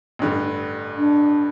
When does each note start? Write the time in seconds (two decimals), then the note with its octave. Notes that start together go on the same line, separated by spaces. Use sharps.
0.19 A1 G2 D3
0.97 D4